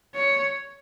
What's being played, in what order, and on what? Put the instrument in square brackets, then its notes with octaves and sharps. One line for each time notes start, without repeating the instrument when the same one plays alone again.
[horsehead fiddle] C#5